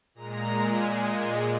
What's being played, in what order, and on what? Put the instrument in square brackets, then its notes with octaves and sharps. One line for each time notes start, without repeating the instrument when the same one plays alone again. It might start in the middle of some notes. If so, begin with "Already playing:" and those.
[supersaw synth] A#2 G#3 A#5
G#5
D#5